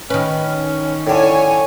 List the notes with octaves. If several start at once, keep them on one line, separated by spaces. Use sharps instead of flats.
D#3 C#4 B4
A2 D3 C#5 G#5